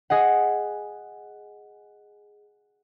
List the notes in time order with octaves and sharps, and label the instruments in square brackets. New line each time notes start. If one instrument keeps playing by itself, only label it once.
[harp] G#4 D#5 F#5